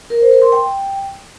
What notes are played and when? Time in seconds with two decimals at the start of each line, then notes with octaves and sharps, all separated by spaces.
0.10 A#4
0.21 C5
0.31 A#4
0.42 C6
0.52 G5